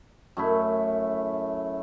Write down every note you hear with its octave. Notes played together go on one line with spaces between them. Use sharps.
F#2 A3 E4